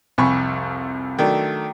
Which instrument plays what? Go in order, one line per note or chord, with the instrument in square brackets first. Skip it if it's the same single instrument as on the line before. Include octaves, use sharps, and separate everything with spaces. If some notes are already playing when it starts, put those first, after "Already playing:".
[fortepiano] C2 F2 G#5 B5 C#6
D#3 F#3 A3 D4